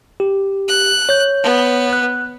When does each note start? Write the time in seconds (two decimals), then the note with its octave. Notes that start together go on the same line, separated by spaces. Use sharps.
0.20 G4
0.68 F#6
1.09 C#5 G6
1.43 B3
1.93 F#6